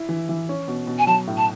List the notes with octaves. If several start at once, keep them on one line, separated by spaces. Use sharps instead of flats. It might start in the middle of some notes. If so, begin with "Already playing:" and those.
Already playing: E4
E3
E3
C#4
B2
B2
G#5
F#3 A5
A2
A5